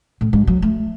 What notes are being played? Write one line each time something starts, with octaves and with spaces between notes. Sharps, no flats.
A2
G#2
F#3
A3